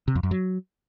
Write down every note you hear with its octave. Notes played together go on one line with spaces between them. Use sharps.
C3
F2
F#2
F#3